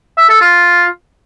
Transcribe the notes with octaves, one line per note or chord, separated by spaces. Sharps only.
E5
A4
F4